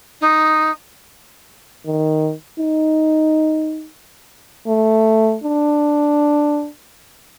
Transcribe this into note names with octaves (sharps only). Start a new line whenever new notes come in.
D#4
D#3
D#4
A3
D4